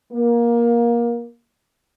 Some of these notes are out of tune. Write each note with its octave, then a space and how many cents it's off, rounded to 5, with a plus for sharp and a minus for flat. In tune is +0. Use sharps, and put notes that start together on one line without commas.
A#3 +20